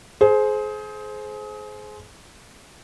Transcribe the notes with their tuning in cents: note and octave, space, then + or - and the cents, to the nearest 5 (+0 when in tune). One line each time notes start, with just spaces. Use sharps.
G#4 +30 C5 +0